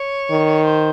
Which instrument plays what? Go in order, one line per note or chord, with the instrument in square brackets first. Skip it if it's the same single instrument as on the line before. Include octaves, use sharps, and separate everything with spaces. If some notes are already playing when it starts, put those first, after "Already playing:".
Already playing: [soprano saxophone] C#5
[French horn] D#3
[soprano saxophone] C5